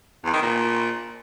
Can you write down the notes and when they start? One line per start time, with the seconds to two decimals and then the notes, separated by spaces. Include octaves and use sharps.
0.24 E2
0.33 D#3
0.42 A#2